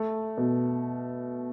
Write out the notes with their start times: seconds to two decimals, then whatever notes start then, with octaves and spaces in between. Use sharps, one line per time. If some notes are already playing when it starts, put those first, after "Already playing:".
Already playing: A3
0.37 B2